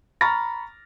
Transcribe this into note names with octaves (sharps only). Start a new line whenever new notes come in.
A#5 B5 C#6 F6 A6 A#6